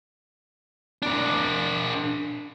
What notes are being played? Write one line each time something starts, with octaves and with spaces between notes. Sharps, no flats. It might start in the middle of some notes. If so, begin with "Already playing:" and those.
D4 A#4